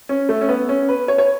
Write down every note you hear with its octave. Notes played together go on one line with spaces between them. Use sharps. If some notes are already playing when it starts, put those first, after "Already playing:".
C#4
A3
C#4
B3
C#4
B4
C#5
C#5